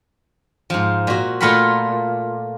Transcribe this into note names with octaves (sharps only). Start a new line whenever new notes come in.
G#2 F3
A#2 F#4
A#2 A3 F4 A#4 F#5 B5